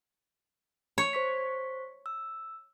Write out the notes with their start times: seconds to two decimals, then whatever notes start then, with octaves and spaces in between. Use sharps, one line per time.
0.98 C#5
1.13 C5 C#6 B6
2.06 E6